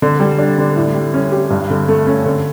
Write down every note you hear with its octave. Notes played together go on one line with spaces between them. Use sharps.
D3
G3
D4
D3
A2
G3
C#4
G4
G2
D3
A3
C#4
D3